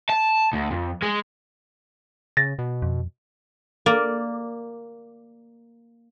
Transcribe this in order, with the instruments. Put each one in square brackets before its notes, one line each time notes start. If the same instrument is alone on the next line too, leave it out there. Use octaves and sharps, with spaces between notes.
[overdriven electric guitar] A5
D2
F2
G#3
[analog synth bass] C#3 [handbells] A6 A#6
[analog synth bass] B2
[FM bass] F2
[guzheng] A#3 D5